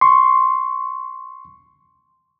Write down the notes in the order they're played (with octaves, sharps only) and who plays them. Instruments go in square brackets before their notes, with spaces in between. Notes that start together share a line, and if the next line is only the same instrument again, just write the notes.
[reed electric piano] C6 C#6